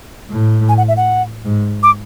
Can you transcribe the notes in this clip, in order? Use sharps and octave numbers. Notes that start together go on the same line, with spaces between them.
A2
G#5
F#5
E5
F#5
G#2
D6